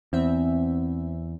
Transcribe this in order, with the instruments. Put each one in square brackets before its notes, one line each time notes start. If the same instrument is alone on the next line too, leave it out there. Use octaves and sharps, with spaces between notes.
[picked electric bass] E2 [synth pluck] C4 E5